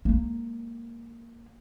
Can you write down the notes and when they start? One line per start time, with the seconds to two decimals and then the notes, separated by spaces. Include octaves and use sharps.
0.05 G#3 A#3